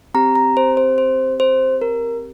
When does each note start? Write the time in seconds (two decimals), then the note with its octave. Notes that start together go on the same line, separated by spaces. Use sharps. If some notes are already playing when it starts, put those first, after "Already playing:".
0.14 C4 G4 A#5
0.35 A#5
0.57 C5
0.77 C5
0.98 C5
1.40 C5
1.81 A#4